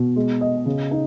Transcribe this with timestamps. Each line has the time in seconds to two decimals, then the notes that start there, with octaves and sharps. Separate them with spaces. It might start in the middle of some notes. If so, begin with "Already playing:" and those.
Already playing: B2
0.16 G#3
0.41 D#5
0.66 C#3
0.91 D#4